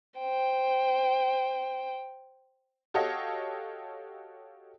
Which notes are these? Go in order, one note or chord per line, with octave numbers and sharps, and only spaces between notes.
C5 G5
F#4 G4 A4 C#5 D#5 F5